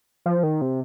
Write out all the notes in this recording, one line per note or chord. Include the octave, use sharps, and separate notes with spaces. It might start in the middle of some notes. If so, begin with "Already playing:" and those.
F3
D#3
C3